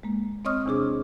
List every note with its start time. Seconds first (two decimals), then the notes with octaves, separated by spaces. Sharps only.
0.03 G#3 A#3
0.45 C4 C#5 D#5 C#6 D#6 F6
0.66 E2 C3 D4 G#4 D6